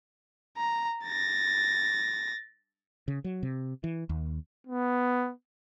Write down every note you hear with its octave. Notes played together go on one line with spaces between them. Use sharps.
A#5
A6 A#6
C#3
F#3
C3
E3
D#2
B3